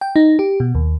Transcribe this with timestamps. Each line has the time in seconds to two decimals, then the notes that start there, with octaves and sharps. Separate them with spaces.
0.01 G5
0.16 D#4
0.39 G4
0.60 B2
0.75 D#2